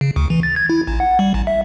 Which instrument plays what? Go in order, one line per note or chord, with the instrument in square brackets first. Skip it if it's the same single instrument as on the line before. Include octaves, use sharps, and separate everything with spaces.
[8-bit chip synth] C#3
D2
E3
A6
G#6
E4
A1
F#5
G3
A1
E5